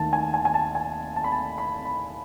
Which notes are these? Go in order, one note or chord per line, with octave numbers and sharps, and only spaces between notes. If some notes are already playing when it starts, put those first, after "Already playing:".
Already playing: D#2 D#3 A3 A5
G#5
G#5
G#5
A5
G#5
A5
B5
A5
B5
B5